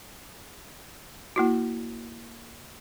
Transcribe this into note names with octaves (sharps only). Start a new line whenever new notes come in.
A#3 E4 F#4